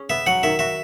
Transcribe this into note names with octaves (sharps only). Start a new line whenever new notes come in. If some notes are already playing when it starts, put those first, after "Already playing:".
Already playing: C#4 G#4
B3 E5
F#3 F#5
D#3 E5
F#4 E5